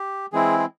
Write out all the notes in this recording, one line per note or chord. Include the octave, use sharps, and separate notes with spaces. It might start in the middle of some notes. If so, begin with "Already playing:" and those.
Already playing: G4
E3 G#3 C4 E4 G#4
G#4